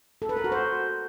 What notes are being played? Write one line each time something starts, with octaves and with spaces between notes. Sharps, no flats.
A4
B4
A#4
F#4
C5